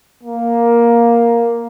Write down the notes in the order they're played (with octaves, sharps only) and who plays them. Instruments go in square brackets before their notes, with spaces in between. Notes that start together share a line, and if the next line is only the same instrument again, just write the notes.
[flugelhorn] A#3